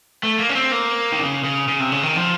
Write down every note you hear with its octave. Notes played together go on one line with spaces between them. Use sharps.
A3
A#3
C#4
C4
A#3
D#3
C#3
C#3
C#3
C3
C#3
D#3
F3